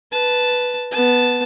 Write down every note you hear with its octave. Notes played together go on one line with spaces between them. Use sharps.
B4 A5
B3 A5